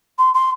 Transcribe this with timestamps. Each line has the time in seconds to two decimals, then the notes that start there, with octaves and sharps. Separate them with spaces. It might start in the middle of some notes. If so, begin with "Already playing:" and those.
0.18 C6
0.34 C6